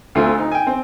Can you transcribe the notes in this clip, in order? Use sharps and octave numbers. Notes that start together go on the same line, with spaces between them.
D2 D3 A3 C4 F4 G#5
D#4
G5 G#5
C4